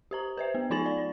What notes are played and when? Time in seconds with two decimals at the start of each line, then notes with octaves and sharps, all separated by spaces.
0.11 G4 C5 A#5
0.37 B4 C5 E5
0.55 B3
0.70 F3 D#4 F4 G#5 A6 F#7
0.86 D5